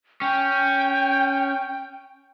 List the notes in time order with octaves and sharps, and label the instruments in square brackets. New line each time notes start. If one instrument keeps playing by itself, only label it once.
[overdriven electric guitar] C#4 [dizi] G5